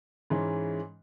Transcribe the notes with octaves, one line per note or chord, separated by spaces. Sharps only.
G#2 E3 G#3 C#4